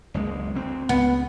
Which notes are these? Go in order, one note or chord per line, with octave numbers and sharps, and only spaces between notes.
F#1 C#2 G#3
D2 C4
C#2 B3